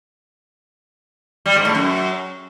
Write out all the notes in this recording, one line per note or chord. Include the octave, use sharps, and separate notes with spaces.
G3
G#2
A2
F#2